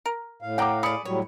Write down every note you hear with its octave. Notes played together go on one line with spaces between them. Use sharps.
A#4
A2 F5
D5 F#5 G5 A#5 D6
G#4 D5 B5 D#6 C#7
A2 F#3 G3 C#5